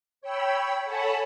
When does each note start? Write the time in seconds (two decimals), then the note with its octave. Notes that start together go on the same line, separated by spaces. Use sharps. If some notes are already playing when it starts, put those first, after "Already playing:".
0.21 C#5 G5 B5 E6
0.84 A4 C#5 F#5 G#5 A5 B5